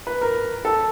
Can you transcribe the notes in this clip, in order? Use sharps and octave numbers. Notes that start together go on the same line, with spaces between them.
B4
A#4
A4